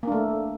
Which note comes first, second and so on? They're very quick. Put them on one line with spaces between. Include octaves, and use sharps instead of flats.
A#3 D4 A3